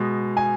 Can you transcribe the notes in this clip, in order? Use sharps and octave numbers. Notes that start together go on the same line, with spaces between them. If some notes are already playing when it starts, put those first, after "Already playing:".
Already playing: B2 G#3
G#5